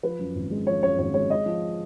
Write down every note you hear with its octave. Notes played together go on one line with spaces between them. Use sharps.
F3 B4
F#2
G#1
G#3
F3 C#5
F#2 C#5
G#1 C#5
G#3 C#5
G#3 D#5
F3